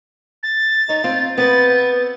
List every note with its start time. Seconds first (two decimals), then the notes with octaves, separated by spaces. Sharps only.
0.43 A6
0.89 D#4 C#5
1.04 C4 F4
1.38 B3 C4 B4 A6